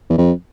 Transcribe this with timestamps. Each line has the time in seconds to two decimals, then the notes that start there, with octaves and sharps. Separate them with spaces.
0.10 E2
0.18 F2